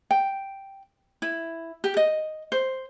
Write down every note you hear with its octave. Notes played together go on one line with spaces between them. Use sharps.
G5
E4
G4
D#5
C5